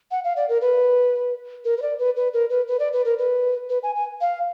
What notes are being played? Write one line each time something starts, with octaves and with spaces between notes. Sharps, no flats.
F#5
F5
D5
A#4
B4
A#4
B4
D5
B4
B4
A#4
B4
B4
D5
B4
A#4
B4
B4
G#5
G#5
F5